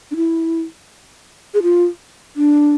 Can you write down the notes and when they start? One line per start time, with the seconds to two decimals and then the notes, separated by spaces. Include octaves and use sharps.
0.11 D4
0.16 E4
1.54 G#4
1.63 F4
2.36 D4